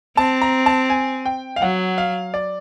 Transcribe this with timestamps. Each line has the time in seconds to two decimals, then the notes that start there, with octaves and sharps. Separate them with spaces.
0.17 C4 A5
0.42 A#5
0.66 A5
0.90 G#5
1.26 G5
1.56 F5
1.61 F#3 F#5
1.98 F5
2.34 D5